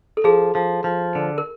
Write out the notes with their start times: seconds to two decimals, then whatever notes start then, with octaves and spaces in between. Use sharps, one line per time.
0.17 A4
0.24 F3 G#4
0.55 F3
0.84 F3
1.15 D3
1.38 A#4